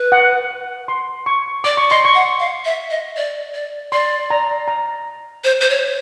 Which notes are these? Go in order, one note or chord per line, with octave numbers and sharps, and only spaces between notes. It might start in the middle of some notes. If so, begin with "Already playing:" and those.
Already playing: B4
F#5
C6
C#6
D5 D6
C#6
D#5 C6
C#6
F#5
F5
E5
D#5
D5
D5
D5 C6
A#5
A#5
C5
C5
C#5